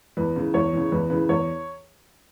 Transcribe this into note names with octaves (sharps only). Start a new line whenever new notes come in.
E2 B4
C#3 E3
E2 C#5
C#3 E3
E2 B4
C#3 E3 B4
E2 C#5